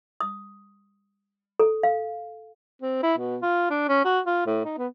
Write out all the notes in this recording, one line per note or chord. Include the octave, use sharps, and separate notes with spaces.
D#6
A4
F5
C4
E4
B2
F4
D4
C#4
F#4
F4
A2
D#4
B3